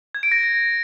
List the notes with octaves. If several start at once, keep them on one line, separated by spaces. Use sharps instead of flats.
G#6
D7
A#6